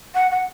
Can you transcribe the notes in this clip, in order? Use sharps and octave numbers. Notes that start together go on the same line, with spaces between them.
F#5
F#5